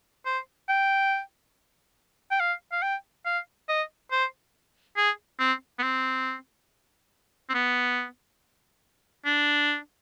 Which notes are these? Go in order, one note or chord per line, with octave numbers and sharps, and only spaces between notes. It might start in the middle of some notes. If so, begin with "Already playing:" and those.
C5
G5
G5
F5
F5
G5
F5
D#5
C5
G#4
C4
B3
C4
C4
B3
D4